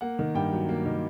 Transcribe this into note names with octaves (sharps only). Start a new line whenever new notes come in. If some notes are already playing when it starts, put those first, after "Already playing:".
A#3 F#5
D#3
G2 G5
F#3
A#3
D#3